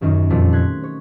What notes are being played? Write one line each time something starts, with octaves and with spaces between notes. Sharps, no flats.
D#1 F#2 D#3 C#4 D#4
F2 A#2 G3 A3
C6 F#6 G#6 B6
C#5